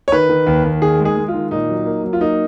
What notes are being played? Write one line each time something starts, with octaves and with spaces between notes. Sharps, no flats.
C#5
D#3 B4
D#3
D#2
D#2
D#3 G#4
G#3
G#4
G#3
F4
D#3
A#2 D#4
F#3
A#3
F#3
F4
A#3 D#4